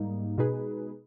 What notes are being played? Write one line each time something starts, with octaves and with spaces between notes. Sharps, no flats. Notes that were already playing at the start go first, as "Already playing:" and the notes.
Already playing: G#2 G3 A#3 D#4
B2 G#3 D#4 G#4 B4